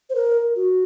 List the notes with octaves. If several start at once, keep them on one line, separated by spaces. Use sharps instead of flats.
C5
A#4
F#4